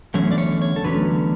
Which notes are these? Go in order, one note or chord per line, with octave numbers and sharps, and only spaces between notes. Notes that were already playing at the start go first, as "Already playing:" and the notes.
E2 D3 F#3 A3 C#4 C#5
D5
C#5
C#5
A4
E2 D3 F#3 A3 C#4 B4